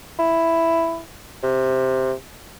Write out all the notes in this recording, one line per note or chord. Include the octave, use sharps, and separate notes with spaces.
E4
C3